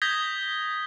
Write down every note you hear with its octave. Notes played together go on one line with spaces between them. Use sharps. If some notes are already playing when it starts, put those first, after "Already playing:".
D#6 G6 G#6 A#6 B6 G7